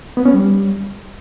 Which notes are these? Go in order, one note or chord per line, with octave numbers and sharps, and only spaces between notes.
B3
C#4
G3